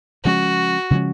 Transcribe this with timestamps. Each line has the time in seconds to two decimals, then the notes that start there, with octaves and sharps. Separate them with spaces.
0.24 C#3 F3 G#3 C#4 F#4
0.91 C#3 F3 G#3 C#4